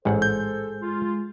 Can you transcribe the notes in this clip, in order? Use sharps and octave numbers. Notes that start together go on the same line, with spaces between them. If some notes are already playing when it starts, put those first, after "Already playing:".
A1 G#2 G#3 A4 C5 F#5
G6
F4